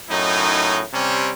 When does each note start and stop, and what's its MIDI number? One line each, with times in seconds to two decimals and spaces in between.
0.11 0.81 42
0.11 0.81 45
0.11 0.81 63
0.93 1.32 48
0.93 1.32 55
0.93 1.32 60
0.93 1.32 61